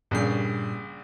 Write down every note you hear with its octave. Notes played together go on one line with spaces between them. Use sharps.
A#1 G2 A#2 C#3 G3 C7